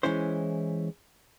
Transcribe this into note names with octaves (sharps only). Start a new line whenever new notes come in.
E3 G#3 C#4 E4 C5